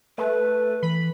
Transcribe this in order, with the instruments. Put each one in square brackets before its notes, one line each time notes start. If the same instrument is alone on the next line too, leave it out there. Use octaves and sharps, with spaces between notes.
[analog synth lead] A3 [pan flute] B4
[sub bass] E3 [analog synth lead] B5